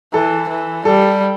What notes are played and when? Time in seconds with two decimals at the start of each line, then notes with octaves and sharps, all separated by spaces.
0.14 E3 A4
0.49 E3
0.85 G3 A4